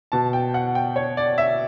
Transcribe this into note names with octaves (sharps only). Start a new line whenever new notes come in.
B2 A5
G5
F#5
G5
C#5
D5
E5